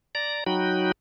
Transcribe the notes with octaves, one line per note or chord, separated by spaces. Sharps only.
D5 A#5
F#3 D#4 F#4 G5 B5